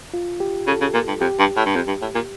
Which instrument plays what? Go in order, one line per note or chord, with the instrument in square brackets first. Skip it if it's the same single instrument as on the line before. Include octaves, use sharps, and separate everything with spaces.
[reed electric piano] F4
G4
[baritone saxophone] C#3 [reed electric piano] A4
[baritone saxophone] C#3
A#2
G2
[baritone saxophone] F2 [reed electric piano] G4
[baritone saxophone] G2
A2
G2
F2
G2
A2
A#2